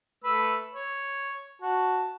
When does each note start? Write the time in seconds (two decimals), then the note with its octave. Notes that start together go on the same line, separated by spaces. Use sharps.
0.24 A3 B4 E6
0.74 C#5
1.62 F#4 A5